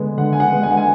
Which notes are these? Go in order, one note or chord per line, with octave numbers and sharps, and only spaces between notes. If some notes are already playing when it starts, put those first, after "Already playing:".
Already playing: D3 G#3 B3
D3 F#5
G#5
F#5
G#3 B3
G#5
F#5
G#5